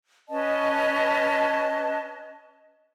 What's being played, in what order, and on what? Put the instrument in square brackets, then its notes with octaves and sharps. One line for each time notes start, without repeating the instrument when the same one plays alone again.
[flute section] C#4 B4 D#5 A5